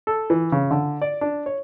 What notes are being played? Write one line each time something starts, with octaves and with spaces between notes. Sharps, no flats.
A4
E3
C#3
D3
D5
D4
C#5